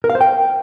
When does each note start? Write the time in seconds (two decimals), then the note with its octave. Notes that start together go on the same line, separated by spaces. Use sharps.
0.04 A#4
0.10 F5
0.15 C5
0.21 G5